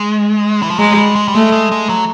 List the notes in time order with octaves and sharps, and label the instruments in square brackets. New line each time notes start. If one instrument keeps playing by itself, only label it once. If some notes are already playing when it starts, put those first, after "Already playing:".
Already playing: [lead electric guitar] G#3
E3
F3
[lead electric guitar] F#3 [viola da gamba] G#3
[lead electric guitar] G3
G#3
G3
[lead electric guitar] G#3 [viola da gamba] A3
[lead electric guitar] G#3
G#3
F#3